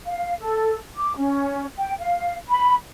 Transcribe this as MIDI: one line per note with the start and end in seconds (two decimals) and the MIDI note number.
0.06 0.35 77
0.40 0.78 69
0.96 1.16 86
1.17 1.67 61
1.77 1.94 79
1.99 2.35 77
2.49 2.75 83